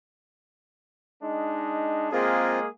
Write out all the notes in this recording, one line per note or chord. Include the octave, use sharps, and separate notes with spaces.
G#3 D4 D#4
G#3 A#3 C4 F4 G#4 A#4